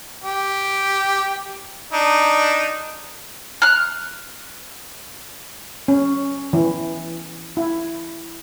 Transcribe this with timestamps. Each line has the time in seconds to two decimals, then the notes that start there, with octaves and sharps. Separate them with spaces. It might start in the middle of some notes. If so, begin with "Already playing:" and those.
0.24 G4
1.93 D4 D#4
3.62 F6 F#6
5.88 C#4
6.53 E3
7.57 E4